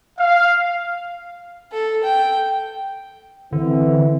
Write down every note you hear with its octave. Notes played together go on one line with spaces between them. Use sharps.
F5
A4
G5
D3 E3 C4